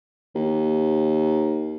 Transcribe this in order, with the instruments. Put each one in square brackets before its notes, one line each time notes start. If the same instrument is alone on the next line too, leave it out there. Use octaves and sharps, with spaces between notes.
[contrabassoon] D#2